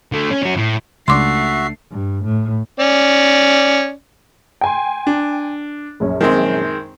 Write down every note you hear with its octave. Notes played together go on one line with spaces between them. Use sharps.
D3 A3
C#4
C#4 F#4
A2
C#2 A3 D4 F#4 E5 C6 D6 C7
G2
A2
C#4 D5
G5 G#5 C6
D4
A#1 F#2 C#4
D#3 G#3 C4